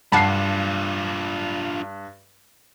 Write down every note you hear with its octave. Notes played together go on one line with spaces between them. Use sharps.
G2 D4 F4 F#5 A5 B5 C7